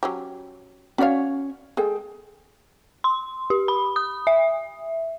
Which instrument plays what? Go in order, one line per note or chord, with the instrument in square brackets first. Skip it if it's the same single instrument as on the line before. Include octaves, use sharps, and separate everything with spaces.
[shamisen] F#3 C#4 G4
[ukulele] C#4 C#5 [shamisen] F#4 D5 F5
[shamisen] G#3 [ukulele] G#4 A4 G5
[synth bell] C6
G4
B5
D#6
E5